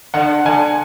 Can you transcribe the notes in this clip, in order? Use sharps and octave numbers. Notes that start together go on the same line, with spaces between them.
D3 F#5
D3 G#5